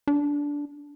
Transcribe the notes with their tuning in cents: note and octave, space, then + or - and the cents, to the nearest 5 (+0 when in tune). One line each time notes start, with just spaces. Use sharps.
D4 -15